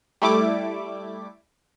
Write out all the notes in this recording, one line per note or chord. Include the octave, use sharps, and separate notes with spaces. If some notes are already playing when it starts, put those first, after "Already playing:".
G3 A3 E4 D6